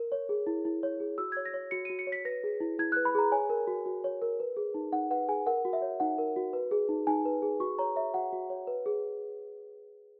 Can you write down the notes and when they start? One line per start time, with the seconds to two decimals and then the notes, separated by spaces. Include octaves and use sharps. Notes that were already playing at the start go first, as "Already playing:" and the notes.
Already playing: A#4
0.12 C#5
0.29 G#4
0.47 E4
0.65 E4
0.83 C#5
1.00 G#4
1.18 F#4 E6
1.32 G#6
1.36 C#5
1.45 A#6
1.54 C#5
1.71 F#4 C#7
1.85 D#7
1.90 F#4
1.99 C#7
2.07 C#5
2.12 B6
2.25 B4 A#6
2.44 G#4
2.60 E4
2.79 E4 G#6
2.92 F#6
2.97 B4
3.05 B5
3.15 G#4 A#5
3.32 C#5 G#5
3.50 A#4
3.67 F#4
3.86 F#4
4.04 C#5
4.22 A#4
4.40 B4
4.57 G#4
4.74 D#4
4.93 D#4 F#5
5.11 B4 F#5
5.29 G#4 G#5
5.46 A#4 F#5
5.65 F#4
5.73 E5
5.82 C#5
6.00 D#4 F#5
6.18 A#4
6.36 F#4
6.53 B4
6.71 G#4
6.89 D#4
7.07 D#4 G#5
7.25 B4
7.42 G#4
7.60 F#4 C#6
7.79 C#5 A#5
7.96 C#5 E5
8.14 F#4 F#5
8.32 F#4
8.50 C#5
8.67 B4
8.86 G#4